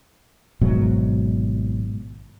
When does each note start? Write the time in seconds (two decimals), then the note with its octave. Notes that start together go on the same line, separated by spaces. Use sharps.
0.61 G#1 G#2 B2 F#3